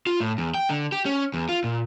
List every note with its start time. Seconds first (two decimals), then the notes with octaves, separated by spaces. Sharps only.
0.07 F4
0.20 A2
0.38 E2
0.54 G5
0.70 D3
0.92 G4
1.06 C#4
1.34 E2
1.49 F4
1.64 A#2